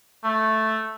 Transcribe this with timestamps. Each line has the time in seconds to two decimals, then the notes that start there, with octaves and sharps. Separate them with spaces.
0.23 A3